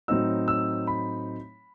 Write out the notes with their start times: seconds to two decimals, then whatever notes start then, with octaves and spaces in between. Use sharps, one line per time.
0.08 A2 F#3 A3 C4 D#4 E6
0.48 E6
0.87 B5